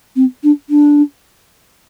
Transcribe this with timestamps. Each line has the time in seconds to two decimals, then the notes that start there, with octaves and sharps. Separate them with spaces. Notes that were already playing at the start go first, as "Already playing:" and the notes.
0.15 C4
0.43 D4
0.69 D4